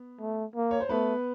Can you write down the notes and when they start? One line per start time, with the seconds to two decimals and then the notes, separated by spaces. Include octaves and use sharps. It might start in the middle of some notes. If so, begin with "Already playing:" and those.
Already playing: B3
0.21 A3
0.55 A#3
0.71 C#5
0.80 C5
0.89 A3 B3 B4